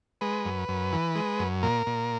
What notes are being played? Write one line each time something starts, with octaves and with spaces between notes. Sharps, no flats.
G#3 B4
F#2
F#2
E3
G#3
F#2
A#2 A#4
A#2